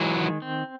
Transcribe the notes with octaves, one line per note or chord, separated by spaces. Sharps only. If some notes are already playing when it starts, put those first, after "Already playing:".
Already playing: E3 F#3 G#3
D#3
C4